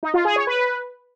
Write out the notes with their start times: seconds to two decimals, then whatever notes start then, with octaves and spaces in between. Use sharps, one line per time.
0.03 D#4
0.14 F4
0.25 G#4
0.36 C#5
0.47 B4